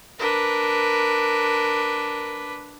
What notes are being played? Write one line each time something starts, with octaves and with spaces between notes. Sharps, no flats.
D4 A#4 B4